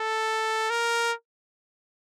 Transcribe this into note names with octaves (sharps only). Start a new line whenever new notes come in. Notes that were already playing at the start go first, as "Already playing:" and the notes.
Already playing: A4
A#4